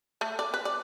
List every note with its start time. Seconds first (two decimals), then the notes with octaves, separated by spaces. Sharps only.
0.21 A3
0.39 D5
0.54 B4
0.65 D5